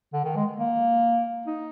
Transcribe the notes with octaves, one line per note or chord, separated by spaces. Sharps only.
D3
D#3
G#3
A#3
D#4